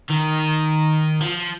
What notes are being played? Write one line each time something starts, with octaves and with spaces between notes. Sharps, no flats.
D#3
F3